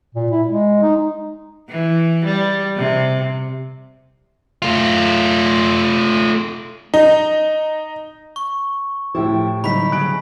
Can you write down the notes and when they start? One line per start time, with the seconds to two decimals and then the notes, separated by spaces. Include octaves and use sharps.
0.15 A#2
0.31 E4
0.48 G#3
0.83 D#4
1.69 E3
2.25 G3
2.76 C3
4.62 A3 F4
6.94 D#4
8.36 C#6
9.15 A2 F3 E4 G4
9.64 D3 F#3 G3 D#4 E4 B5 B6
9.92 C#3 F#6 D7